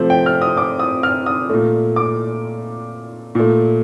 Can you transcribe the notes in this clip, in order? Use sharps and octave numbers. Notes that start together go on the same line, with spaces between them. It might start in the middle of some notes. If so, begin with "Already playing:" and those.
Already playing: C3 F3 A3 C5
G5
F6
D#6
D6
D#6
F6
D#6
A#2 A3
D6
A#2 A3